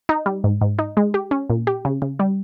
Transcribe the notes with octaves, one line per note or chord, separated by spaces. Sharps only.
D#4
G3
G#2
G#2
D#4
G#3
G4
C#4
A#2
G4
C#3
C#3
G3